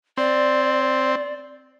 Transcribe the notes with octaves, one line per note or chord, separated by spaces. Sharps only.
C4 D5